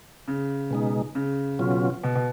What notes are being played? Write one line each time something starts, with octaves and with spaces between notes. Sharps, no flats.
C#3
B2 G#3 D#4
C#3
B2 F#3 C#4 F4
B2
B2